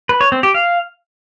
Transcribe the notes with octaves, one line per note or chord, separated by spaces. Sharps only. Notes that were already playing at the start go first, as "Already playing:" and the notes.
B4
C#5
C4
G4
F5